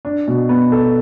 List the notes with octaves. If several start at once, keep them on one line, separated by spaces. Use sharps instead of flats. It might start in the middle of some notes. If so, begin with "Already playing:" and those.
D4
B2
B3
A4